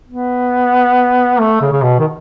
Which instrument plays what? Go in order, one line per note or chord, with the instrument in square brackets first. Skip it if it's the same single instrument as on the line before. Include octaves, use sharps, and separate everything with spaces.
[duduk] B3
A3
C#3
C#3
B2
D#3